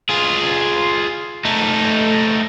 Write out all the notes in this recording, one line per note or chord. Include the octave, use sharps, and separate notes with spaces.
F4 G#4
A3 D#4